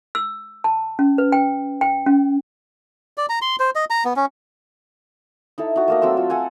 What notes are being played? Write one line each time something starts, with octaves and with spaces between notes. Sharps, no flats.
E6
A5
C#4
B4
G5
G5
C#4
D5
A#5
C6
C5
D#5
A#5
B3
C#4
D#4 E4 A4
D#4 F#4
A3 A#3 D#5
F#3 C4 A4 E6
F4
A4 F#5 G#5